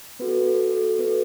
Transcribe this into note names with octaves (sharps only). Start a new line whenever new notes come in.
B3 F#4 A4 B4
A4
A4
B3 F#4 A4 B4